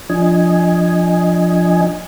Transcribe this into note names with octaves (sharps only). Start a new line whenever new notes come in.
F3 D4 D#5 G#5